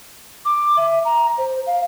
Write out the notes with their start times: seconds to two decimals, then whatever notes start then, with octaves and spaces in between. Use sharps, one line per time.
0.45 D6
0.77 E5
1.05 A#5
1.38 C5
1.67 F5